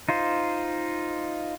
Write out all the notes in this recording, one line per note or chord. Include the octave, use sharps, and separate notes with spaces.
D#4 F4 C5